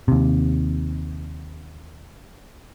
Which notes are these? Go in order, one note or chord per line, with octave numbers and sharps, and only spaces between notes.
D#2 C3